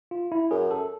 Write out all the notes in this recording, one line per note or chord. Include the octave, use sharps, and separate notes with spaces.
F4
E4
F#2 G#4
A4